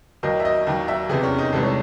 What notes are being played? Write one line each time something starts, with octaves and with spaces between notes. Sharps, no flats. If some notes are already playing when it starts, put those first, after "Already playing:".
D#2 D#3 F#3 D#5
E5
D#5
D#2 D#3 F#3
E5
E2 C3 E3 G#4
C#4
D#4
C2 C3 E3 G#3 A4
C#5